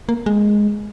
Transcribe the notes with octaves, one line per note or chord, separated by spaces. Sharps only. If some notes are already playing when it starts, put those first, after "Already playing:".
A#3
G#3